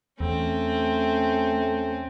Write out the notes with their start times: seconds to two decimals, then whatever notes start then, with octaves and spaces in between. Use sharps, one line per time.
0.20 E2 A3 C4 C#4